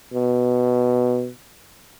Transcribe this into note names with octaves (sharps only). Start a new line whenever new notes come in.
B2